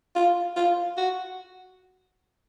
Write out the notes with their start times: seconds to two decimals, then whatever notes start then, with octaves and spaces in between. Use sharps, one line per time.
0.16 F4
0.56 F4
0.97 F#4